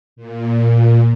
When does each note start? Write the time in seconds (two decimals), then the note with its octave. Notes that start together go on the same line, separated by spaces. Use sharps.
0.16 A#2